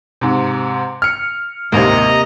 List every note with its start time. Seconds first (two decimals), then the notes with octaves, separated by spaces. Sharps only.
0.21 G#2 C3
1.02 F6 C#7
1.72 A1 D#2 G#2 C3 A#3 D#5 A#5